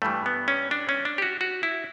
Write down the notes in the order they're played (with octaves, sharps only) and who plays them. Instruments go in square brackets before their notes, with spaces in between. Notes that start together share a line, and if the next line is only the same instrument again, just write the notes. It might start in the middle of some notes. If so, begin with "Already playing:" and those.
[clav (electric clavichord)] G2 E3 G3 A3
B3
C#4
D4
C#4
D4
G4
F#4
F#4
E4